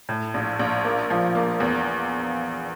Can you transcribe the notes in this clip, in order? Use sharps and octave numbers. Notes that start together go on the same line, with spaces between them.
A2
A#1
A#1
A#3
F3
A#3
E2